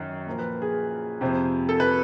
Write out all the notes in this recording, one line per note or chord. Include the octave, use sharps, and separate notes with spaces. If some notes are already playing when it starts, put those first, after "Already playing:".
Already playing: F#2 D#3
A#2 F3 A#4
B4
G#4
F2 C3 F3
A4
B4